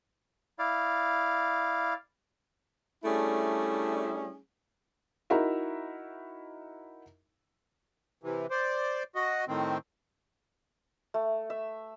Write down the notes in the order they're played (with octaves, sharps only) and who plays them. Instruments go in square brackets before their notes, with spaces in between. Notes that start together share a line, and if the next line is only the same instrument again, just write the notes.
[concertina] E4 D5 F5
[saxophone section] G3 A3 C#4 D4 E4 G#4
[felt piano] D#4 E4 F#4 A#4 E5
[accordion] C3 E3
C5 D5
F#4 D#5
A2 D#3 C4
[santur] A3
E5